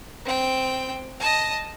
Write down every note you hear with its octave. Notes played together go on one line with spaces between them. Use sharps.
C4 G5
D#5 A5